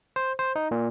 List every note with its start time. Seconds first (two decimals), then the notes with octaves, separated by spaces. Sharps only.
0.16 C5
0.39 C5
0.56 D#4
0.71 A#2